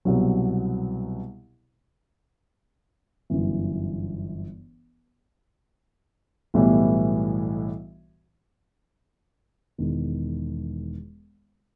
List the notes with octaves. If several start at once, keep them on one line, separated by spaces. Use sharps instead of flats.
C2 B2 F#3
G1 F#2 E3
B1 A2 E3 G3 B3
E1 E2 D#3